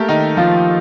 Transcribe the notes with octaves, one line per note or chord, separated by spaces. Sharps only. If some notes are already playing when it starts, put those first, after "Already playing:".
Already playing: A3 A#3 G4 A4 A#4
D#3 D#4
F3 F4